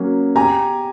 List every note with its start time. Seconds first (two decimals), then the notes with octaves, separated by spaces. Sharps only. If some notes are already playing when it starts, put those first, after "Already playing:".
Already playing: F#3 A#3 C#4
0.35 G4 G#5 A#5